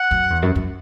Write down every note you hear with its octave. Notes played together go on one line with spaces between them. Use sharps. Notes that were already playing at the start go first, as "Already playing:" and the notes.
Already playing: F#5
F#2
E2
F#2
F#2